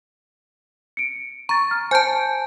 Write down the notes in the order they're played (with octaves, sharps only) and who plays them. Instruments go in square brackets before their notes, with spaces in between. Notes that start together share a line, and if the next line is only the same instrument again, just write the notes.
[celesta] C#7 D7
[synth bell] A#5 [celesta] C#6 A6
[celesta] F6
[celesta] C5 G6 [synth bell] G#5 A5